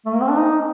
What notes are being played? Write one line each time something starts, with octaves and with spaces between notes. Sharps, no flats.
A3
A#3
C4
D4
D#4